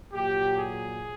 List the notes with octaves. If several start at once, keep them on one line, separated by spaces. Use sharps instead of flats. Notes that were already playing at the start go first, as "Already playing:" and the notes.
A#2 F#3 G4
G#4